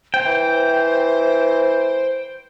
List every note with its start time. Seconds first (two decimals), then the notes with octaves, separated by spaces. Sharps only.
0.14 C5 G5
0.26 E3